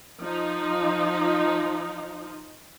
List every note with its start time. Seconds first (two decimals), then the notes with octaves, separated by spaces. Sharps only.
0.23 F3 D#4